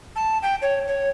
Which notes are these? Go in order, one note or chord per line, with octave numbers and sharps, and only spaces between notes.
A5
G5
C#5
C#5